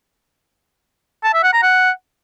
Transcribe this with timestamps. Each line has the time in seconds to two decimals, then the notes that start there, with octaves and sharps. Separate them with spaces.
1.24 A5
1.33 E5
1.43 F#5
1.53 A#5
1.63 F#5